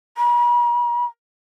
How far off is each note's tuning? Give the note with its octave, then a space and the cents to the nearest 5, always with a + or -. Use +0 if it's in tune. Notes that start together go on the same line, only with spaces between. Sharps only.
B5 -45